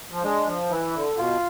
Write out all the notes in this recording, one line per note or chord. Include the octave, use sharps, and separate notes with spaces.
F3
G#3 D4
F3
E3 E4
D3
B2 F4